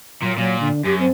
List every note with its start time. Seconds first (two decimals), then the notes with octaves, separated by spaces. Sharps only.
0.22 A#2 F#3
0.37 A#2 F#3
0.60 D3
0.85 F#2 G4
0.99 C4